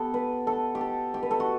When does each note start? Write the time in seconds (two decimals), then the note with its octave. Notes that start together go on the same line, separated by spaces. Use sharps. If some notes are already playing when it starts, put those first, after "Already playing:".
Already playing: B3 G4 A4
0.14 B4
0.47 A4
0.75 G4
0.81 A4
1.14 G4
1.23 B4
1.31 A4
1.40 F#4